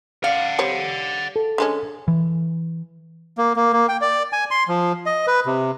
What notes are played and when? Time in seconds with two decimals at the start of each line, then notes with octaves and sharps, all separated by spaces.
0.24 D5 F5 F#5
0.59 G3 C4 C#5
1.36 A4
1.58 D3 G#3 C#4
2.08 E3
3.38 A#3
3.56 A#3
3.73 A#3
3.89 G5
4.01 D5
4.33 G#5
4.51 C6
4.68 F3
5.06 D#5
5.27 B4
5.46 C3